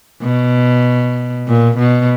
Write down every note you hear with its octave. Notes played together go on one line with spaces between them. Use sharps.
B2
A#2
B2